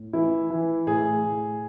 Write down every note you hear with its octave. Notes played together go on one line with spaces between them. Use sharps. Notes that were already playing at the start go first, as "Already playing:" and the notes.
Already playing: A2
E3 E4
E3
A2 G#4
A2